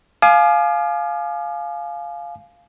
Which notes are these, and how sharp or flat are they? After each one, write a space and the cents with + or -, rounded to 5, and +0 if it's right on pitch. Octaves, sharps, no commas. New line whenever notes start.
F5 +0 G#5 +30 D6 +40